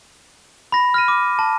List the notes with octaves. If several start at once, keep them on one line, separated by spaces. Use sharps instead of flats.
B5 A#6
F6 A#6 D#7
D6
A5